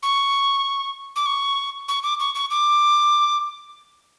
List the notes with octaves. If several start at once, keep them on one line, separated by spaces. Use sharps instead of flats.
C#6
D6
C#6
C#6
D6
C#6
C#6
D6